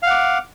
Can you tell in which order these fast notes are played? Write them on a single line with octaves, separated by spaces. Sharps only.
F5 F#5 D6